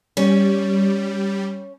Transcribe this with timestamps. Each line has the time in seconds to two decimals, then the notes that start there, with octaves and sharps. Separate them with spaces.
0.17 G3 C#4